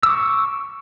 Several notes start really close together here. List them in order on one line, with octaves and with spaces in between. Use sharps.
E6 D6 C#6